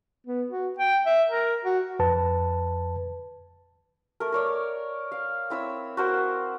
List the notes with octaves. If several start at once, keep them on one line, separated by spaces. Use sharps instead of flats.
B3
F#4
G5
E5
A#4
F#4
F2 B4 A5
A3 A#4
A#4 C#5 D5
F5
C4 E4 C#5 E6
F#4 A#4 C5